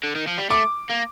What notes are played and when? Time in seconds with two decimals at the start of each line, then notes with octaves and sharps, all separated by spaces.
0.03 D3
0.16 D#3
0.27 F3
0.38 G3
0.50 A3 D6
0.90 A#3